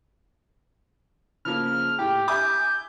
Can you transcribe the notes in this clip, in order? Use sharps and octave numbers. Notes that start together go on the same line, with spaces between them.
C#3 F3 A#3 F6
A2 G4
E5 G#5 D6 G6